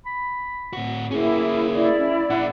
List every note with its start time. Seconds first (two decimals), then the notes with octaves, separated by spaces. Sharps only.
0.06 B5
0.73 A2 F#4
1.11 A#3 C#4 E4 G#4
1.74 E4 D5
1.99 C#4
2.30 A#2 D4 F#5